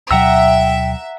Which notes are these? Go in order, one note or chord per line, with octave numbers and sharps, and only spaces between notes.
D2 B2 F#3 E5 F#5 G5 A#5 E6